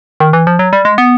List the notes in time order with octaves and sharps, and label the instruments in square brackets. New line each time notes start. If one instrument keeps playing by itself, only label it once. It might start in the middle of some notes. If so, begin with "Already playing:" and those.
[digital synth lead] D#3
E3
F3
F#3
G3
G#3
B3